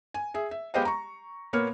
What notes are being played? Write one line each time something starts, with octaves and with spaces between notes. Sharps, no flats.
G#5
G#4 E5
E5
G#3 B3 G4 C5 D#5 F5
A#5 C#6
A#2 A#3 B3 C#5 F6